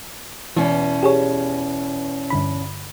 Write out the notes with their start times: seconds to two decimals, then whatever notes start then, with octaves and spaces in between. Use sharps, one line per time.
0.57 E2 B2 E3 C#4
1.03 G4 G#4 C#5
2.30 G2 D3 B5